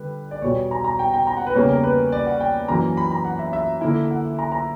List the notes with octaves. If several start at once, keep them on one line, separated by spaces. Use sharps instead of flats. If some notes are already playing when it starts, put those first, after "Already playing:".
Already playing: D3 G3 B4
D5
E2 B2 G3 C#5
A#5
A#5
G5
G5
A#5
F#5
B4
E2 C#3 G3 A#3 C#5
A#4
B4
D5
F#5
G5
F#2 E3 A#3 A#5
B5
A#5
F#5
E5
E5
D3 A#3 E4
F#5
A#5
A#5